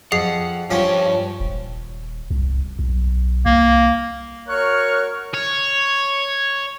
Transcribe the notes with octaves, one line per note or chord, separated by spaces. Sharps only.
F2 G#4 F#5 C7
G2 F3 C#4 G4 C#5
D#1
C2
B1
C2 A#3
F#4 A#4 C#5 C#6 F6 F#6
C#5